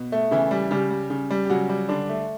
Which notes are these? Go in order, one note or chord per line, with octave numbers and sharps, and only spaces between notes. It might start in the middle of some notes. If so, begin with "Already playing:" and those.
Already playing: B2
A3
C#3 E3 E4
G3
C#3 G3 G4
G3
C#3
G3
G4
C#3 F#3 F#4
G3
D3 D4
A3